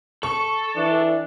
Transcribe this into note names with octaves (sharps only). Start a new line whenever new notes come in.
A4 C#6
E3 D4